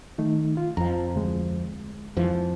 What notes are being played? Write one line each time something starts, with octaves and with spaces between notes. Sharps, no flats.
D#3 A3 D#4
F4
F2 F3 A#5
D2 G#3
F2 E3 F3